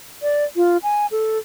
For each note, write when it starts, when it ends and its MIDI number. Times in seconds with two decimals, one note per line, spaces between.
0.22 0.45 74
0.56 0.77 65
0.83 1.06 80
1.11 1.38 69